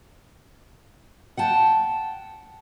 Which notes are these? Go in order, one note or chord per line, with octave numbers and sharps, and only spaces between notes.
F#5 G5 A5